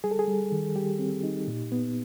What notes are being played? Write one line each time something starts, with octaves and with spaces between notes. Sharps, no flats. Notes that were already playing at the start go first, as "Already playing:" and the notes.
G3 G#4
A4
G#4
G3
D#3
G3 G4
C4
D#4
A#2
B3